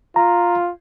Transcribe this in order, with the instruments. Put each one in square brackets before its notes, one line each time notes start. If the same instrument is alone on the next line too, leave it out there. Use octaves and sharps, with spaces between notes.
[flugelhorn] F4 [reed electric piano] A#5